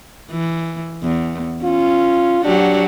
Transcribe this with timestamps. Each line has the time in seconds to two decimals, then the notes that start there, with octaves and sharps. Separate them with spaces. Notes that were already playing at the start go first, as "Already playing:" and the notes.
0.31 E3
1.03 E2
1.63 C#4 F4
2.44 F#3 D4 F#4 G4